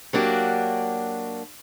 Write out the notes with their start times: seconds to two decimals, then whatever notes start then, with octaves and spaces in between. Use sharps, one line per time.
0.13 F#3 A#3 D4 F#4 G4